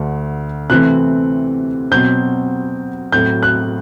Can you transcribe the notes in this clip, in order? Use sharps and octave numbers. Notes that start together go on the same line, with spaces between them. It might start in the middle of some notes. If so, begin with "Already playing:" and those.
Already playing: D2 D3 A3 D4
C3 E3 A3 C4 F#6
B2 F#3 C4 G6
A2 F#3 C4 G6
F#6